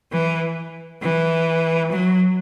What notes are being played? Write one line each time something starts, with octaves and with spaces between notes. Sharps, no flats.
E3
E3
F#3